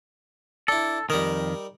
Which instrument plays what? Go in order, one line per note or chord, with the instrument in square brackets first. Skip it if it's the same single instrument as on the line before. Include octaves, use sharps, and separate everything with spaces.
[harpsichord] D4 E4 [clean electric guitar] A4
[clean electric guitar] F2 D#3 [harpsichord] G3 D#4 A#4